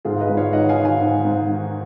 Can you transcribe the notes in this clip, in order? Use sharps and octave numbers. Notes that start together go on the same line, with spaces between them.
G#2 F4 G#4
B4 D#5
G#2
C#5 F5
D#3 D#5 F#5
F5 G#5
D#3
F5 G#5
G#2
G#2
D#3